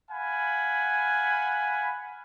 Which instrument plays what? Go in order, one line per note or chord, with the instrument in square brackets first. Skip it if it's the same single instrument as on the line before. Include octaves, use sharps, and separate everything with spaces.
[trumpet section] F5 F#5 G#5 B5